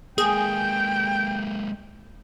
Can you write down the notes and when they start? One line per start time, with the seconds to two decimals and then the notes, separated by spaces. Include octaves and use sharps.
0.18 G#3 A#3 G#4 G5